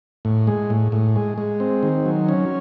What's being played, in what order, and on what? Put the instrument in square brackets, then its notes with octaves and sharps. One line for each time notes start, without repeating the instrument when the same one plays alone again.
[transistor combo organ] A2
G#3
A2
A2
G#3
G#3
C4
D#3
F#3
C#4